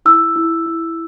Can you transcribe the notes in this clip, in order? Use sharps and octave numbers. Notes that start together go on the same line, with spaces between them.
E4 E6
E4
E4